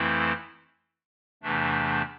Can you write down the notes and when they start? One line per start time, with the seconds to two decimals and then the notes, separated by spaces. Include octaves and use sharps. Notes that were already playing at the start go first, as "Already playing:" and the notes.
Already playing: F2 E3 A3 C4 E4
1.43 E2 C3 E3 A3 D4